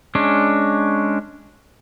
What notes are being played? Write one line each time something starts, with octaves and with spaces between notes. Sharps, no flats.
G#3 C#4 D4